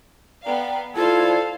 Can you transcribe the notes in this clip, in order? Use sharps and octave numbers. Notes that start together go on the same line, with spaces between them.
B3 D5 F5 G5 A#5
E4 F4 A4 C5 D5 F5 G#6